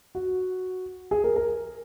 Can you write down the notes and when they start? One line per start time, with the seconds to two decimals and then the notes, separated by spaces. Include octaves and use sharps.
0.15 F#4
1.11 G#4
1.24 A#4
1.36 A#4